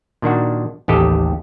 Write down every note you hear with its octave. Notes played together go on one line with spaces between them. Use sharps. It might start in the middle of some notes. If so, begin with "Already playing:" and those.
A#2 D#3 D4 F#4
A1 D#2 G4 A4 D#5